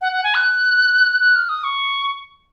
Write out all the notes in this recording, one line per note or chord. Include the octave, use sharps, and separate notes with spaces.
F#5
F#5
G#5
F#6
F#6
F6
D#6
C#6